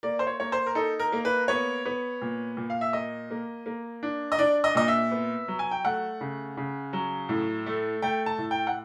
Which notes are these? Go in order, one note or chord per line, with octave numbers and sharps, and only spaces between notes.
A#3 D5
C5
C#5
A#3 C#5
C5
A#4
D#4 A4
A#4
A#3
B4
B3 C#5
B3
A#2
A#2
F5
E5
A#3 D#5
A#3
A#3
D4
D#5
D4 D5
D#5
A#2 D#5
E5
B3
F#3
G#5
G5
A3 F#5
C#3
C#3
F#3
A2
A3
A3 G5
A5
A2
G5
F#5